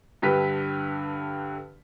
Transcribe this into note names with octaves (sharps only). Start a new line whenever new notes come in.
G2 D3 G4 B4 B6